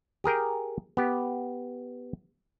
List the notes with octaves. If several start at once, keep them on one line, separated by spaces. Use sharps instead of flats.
G4 G#4 A#4 G5
B3 G4